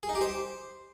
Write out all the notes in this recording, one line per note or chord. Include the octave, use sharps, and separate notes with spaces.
G#4
D#4
G4
C5